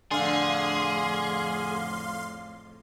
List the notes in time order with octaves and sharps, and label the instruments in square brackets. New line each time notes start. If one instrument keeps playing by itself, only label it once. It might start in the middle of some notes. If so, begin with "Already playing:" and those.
[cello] F2 A2 [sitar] D3 [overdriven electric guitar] G#4 [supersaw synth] F5 C6